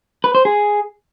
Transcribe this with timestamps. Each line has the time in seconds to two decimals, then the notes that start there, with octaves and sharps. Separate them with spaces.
0.24 B4
0.35 C5
0.45 G#4